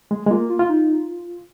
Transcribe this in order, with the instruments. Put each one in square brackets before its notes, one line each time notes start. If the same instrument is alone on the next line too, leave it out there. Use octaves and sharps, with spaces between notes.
[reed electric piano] G#3
G#3
[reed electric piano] A#3 [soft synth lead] F4
[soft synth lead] F4
[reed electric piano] F4
[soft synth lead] D#4